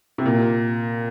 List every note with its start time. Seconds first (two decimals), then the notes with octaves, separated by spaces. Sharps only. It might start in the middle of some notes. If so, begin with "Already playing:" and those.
0.18 C3
0.26 A#2